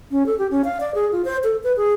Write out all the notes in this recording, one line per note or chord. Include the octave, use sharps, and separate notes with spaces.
C#4
A4
G4
C#4
F5
D5
G#4
F4
C5
A4
B4
G#4